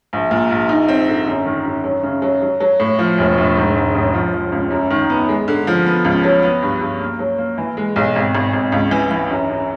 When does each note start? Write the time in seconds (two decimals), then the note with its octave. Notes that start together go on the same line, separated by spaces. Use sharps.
0.13 A#1
0.31 A#2
0.51 A#1
0.69 D#4
0.88 C4
1.08 D3
1.28 F#2
1.46 D#3
1.66 F#2
1.84 F#3
2.03 C#3
2.22 F#3
2.42 F#3
2.60 F#3
2.80 A2
2.99 F3
3.18 E1
3.38 E1
3.57 G#2
3.76 G#2
3.95 A1
4.14 F3
4.34 F3
4.52 C#2
4.71 F#2
4.90 D#3
5.10 B3
5.29 G#3
5.48 D3
5.67 F3
5.86 B3
6.05 C#2
6.24 F#3
6.43 B3
6.63 G2
6.81 G2
7.00 A#3
7.19 F#3
7.38 A#3
7.58 E3
7.77 G#3
7.96 B1
8.16 G#1
8.35 G#1
8.53 G#1
8.72 C#2
8.91 E3
9.11 E3
9.31 F#2
9.50 F#2